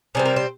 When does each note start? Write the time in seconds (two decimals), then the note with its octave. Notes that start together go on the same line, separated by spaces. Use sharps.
0.15 C3 G3 C4 G#4
0.25 A#4
0.36 C5